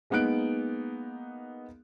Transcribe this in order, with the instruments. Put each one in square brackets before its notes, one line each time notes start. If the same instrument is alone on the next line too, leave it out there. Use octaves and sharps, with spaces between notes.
[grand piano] G#3 A#3 B3 D#4 F#6 D7